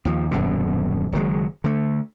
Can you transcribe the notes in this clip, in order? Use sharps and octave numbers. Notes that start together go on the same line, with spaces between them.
D#2 F3
D#1 F#2 B2 D3
F#1 D#3 F#3 G#3
D3 A3